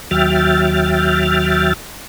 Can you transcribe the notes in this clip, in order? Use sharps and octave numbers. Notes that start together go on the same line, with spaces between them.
D#2 F#3 E5 G5 F6 A6